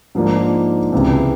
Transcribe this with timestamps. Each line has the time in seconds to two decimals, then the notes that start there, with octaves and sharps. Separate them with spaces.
0.15 G#2 F3 A#3 D4
0.92 C#2 C3 E3